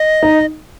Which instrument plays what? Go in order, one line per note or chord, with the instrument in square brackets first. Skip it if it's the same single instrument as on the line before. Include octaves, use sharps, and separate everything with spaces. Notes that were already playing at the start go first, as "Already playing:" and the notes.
Already playing: [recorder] D#5
[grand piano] D#4